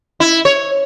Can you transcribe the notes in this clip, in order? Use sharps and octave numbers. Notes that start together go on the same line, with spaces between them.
E4
C#5